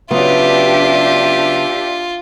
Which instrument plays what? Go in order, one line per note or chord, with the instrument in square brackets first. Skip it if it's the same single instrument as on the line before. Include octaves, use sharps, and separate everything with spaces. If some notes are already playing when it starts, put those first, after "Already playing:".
[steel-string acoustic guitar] C#3 F#3 B3 [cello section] D4 G4 [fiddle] F4 [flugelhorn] E5